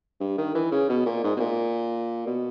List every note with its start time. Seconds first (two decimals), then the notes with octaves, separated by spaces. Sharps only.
0.20 G2
0.38 D#3
0.54 E3
0.72 C#3
0.89 B2
1.06 A#2
1.24 G#2
1.36 B2
1.40 A#2
2.26 B2